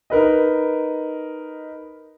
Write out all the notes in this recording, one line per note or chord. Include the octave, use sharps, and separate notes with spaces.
D#4 A#4 B4 D#5